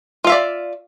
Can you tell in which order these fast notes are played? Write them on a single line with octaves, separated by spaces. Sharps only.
F4 F5 E5 D5